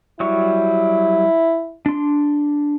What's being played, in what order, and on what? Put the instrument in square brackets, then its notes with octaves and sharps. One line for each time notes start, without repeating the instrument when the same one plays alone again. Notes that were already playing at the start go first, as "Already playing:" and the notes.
[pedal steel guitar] F#3 G3 C#6 [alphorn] E4
[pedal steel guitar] D4 C6